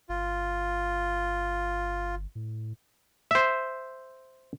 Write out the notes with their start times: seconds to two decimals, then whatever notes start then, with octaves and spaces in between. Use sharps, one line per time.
0.09 G1 F4
2.35 A2
3.31 C5 E5